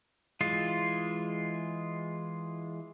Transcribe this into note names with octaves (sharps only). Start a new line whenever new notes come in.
E3 G#3 F4